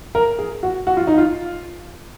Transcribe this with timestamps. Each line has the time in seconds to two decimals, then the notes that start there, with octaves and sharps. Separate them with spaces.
0.15 A#4
0.39 G#4
0.63 F#4
0.87 F#4
0.97 F4
1.07 D#4
1.18 F4